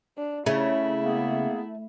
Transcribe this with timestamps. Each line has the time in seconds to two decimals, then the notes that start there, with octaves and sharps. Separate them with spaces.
0.17 D4
0.46 C#3 A3 E4
1.02 A#3 B3 G#4